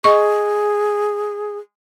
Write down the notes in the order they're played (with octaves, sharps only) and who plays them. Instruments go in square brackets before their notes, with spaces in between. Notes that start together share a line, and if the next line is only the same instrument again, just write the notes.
[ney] G#4 [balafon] D#5 C#6